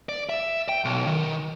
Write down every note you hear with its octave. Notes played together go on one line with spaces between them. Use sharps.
D5
E5
G5
B1
D#3